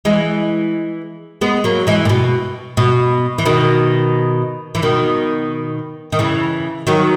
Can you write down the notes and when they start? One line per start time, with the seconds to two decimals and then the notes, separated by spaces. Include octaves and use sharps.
0.05 E3 G#3
1.41 G#3 B3
1.64 F#3 A#3
1.87 E3 G#3
2.05 A#2
2.09 B2
2.77 B2
3.38 E3
3.46 B2 D#3
4.75 E3
4.82 B2 D#3
6.12 D#3
6.19 C#3 E3
6.87 D#3 F#3